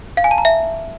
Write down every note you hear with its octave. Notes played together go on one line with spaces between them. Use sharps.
F5
G#5
A5
A#5
E5